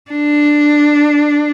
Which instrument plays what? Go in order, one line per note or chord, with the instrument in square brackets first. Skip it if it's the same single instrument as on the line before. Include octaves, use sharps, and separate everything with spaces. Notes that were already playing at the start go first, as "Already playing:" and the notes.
[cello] D4